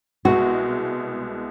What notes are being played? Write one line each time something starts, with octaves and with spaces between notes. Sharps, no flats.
C2 B2 G#3 F#4